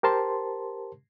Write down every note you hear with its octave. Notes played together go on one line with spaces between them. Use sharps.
G4 A#4 C5 A5 C6